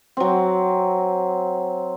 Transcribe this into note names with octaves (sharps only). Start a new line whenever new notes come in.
F#3 C4